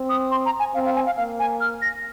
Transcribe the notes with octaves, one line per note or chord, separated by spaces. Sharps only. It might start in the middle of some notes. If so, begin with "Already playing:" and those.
Already playing: C4
D#6
C6
A#5
G#5
C4 F5
F5
G#5
F5
A#3 F5
G#5
F6
A#6